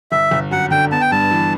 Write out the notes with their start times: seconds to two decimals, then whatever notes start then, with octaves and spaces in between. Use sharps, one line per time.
0.11 G1 E5
0.31 G1
0.51 F#2 F#5
0.71 D3 G5
0.91 B3 A5
1.01 G5
1.12 G2 A5
1.31 E3